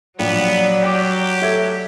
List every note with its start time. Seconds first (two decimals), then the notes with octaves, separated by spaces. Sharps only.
0.19 A#1 F#3 B3 D5 G5
0.83 G4 G5 D6
1.42 A4 E5 G#6